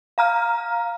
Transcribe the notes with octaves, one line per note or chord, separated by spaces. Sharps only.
F5 A#5 F6